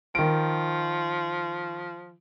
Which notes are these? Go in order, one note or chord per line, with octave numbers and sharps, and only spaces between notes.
D#3 F3 D7